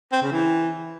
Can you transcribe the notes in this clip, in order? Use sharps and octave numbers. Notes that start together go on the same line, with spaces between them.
C4
C#3
E3